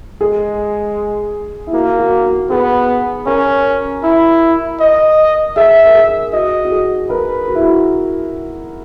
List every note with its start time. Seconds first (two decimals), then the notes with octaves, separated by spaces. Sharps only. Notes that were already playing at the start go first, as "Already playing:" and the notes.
0.21 G#3 G#4
1.67 E4
1.73 A#3 F#4
1.99 F#4
2.24 F#4
2.50 B3 G#4
3.26 C#4 A#4
4.03 E4
4.80 D#5
5.56 G#4 E5
5.86 A#4
5.94 G#4
6.33 F#4 D#5
6.65 F#4
6.71 G#4
7.10 A#4 B4
7.48 F#4
7.55 E4
7.62 F#4